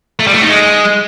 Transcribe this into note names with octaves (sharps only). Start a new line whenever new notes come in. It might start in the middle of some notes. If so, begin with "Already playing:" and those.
A3
G3
A3
D#4
G#3